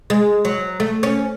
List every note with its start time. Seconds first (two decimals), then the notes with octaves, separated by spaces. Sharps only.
0.10 G#3
0.45 F#3
0.80 A3
1.03 C#4